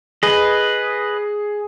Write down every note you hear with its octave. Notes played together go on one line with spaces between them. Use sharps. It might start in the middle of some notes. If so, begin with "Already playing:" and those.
G#4 B4 D#5